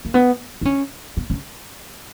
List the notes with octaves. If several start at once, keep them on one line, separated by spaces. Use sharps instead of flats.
A#3
B3
D#4
C#4
B3
C#4